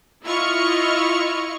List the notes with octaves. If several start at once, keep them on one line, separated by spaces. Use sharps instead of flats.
E4 F4 D#5 C#6 F6